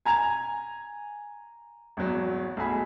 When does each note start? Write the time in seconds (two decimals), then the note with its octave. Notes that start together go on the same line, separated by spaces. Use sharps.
0.05 G#5 A#5 G#6 F7
1.97 G#1 E2 F#3
2.57 B1 A3 G#4 B5